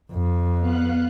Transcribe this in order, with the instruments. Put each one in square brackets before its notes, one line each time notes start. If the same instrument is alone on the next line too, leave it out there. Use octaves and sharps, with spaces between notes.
[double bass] F2
[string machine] B3 F5 F#6